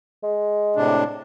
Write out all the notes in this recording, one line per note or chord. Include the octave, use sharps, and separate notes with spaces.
G#3
A2 C3 D4